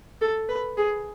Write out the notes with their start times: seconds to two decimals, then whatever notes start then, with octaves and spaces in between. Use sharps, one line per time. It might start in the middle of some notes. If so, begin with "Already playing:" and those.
0.21 A4
0.49 B4
0.77 G#4